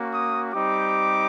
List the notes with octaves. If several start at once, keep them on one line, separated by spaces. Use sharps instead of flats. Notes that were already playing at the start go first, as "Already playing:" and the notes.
Already playing: A#3 C#4 F#4
D#6
G3 C4 D#4 G4 D6